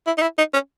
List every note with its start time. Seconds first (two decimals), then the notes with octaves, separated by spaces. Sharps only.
0.07 E4
0.18 D#4
0.22 E4
0.38 D#4
0.54 C#4